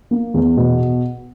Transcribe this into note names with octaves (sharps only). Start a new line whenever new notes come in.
A#3
E2
B2